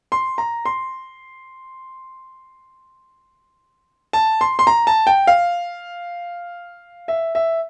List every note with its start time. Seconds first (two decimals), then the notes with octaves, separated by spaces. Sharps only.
0.12 C6
0.38 A#5
0.65 C6
4.13 A5
4.41 C6
4.59 C6
4.67 A#5
4.87 A5
5.07 G5
5.27 F5
7.08 E5
7.35 E5